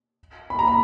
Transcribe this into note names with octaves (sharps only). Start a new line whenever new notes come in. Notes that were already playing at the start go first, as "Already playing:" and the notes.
B5
A#5
B5